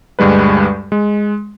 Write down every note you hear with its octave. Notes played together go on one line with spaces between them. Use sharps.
D2 G2 G3 G#3 B4
G#3